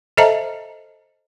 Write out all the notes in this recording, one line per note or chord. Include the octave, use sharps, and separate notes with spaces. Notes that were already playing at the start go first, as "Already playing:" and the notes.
A4 C5 D#5 E5 A5 A#5